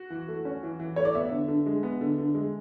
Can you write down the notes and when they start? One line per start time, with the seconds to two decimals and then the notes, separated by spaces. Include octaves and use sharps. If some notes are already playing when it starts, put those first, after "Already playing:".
Already playing: F#4
0.10 E3
0.28 A3
0.45 C#4
0.63 E3
0.80 E3
0.96 A3 C#5
1.05 D5
1.15 B3 E5
1.31 D3
1.48 D3
1.66 G#3
1.83 B3
2.01 D3
2.18 D3
2.35 G#3